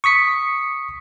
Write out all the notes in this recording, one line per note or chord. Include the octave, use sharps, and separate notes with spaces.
C#6 D#6 B6 C#7